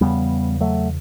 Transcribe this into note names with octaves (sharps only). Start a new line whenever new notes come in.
E2 C#3 G3 B3
F#3 A3